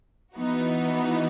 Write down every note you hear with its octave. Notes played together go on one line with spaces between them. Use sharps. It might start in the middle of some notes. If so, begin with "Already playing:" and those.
E3 B3 D#4 F#4